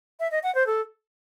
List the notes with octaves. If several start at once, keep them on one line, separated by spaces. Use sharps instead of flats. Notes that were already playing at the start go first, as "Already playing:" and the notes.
E5
D#5
F#5
C5
A4